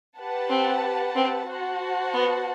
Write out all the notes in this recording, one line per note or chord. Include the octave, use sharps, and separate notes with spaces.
G4 B4 F#5 A5
C4
C4
F#4 C5 F#5 A5
B3